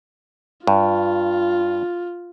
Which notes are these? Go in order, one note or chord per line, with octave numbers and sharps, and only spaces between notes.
G2 F4